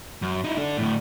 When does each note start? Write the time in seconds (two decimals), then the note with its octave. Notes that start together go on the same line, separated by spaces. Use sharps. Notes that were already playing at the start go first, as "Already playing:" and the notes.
0.22 F#2
0.44 D#4 E4
0.57 D4 A4
0.78 D2 A2